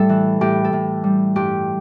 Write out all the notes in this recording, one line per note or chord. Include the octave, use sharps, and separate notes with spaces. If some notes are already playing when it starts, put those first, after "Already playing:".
Already playing: A2 G3 A4 E5
E3
A2 G4
A4
A2
G3
G2 G4